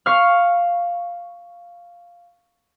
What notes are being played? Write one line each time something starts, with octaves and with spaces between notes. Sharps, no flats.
F5 C#6 F6